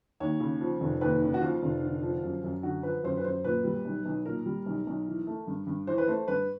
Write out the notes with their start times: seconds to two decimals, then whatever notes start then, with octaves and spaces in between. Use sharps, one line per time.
0.20 D#2 C#5
0.40 C#3
0.61 F3
0.81 F1
1.01 D#2 B4
1.22 C#3
1.34 F#4
1.41 F3 F4
1.62 F1
1.83 D3
2.03 F3
2.23 F#2
2.44 F#2
2.63 D3 F#4
2.83 F3 B4
3.04 F#2 C5
3.17 B4
3.24 F#2 C5
3.44 A#2 B4
3.64 G3
3.85 B1
4.06 B1
4.26 A#2 A#4
4.46 G3
4.66 B1
4.87 B1
5.07 E3
5.27 A3
5.47 G2
5.67 G2
5.87 E3 C5
5.98 B4
6.08 A3 C5
6.28 G2 B4